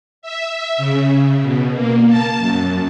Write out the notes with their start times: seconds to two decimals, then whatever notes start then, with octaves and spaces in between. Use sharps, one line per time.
0.22 E5
0.77 C#3
1.11 C#3
1.41 B2
1.74 A#3
2.08 A5
2.38 F#2